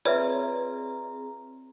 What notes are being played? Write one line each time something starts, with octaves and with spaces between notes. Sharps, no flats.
C4 F4 G#4 B4 C#5 D5 E5 A#5